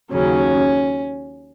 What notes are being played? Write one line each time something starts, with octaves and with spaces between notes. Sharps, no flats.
D#2 C#3 F#3 C#4